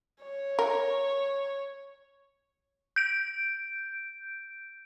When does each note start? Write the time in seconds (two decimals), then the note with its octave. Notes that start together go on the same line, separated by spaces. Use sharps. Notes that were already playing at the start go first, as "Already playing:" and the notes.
0.23 C#5
0.59 A#4
2.96 G6 D7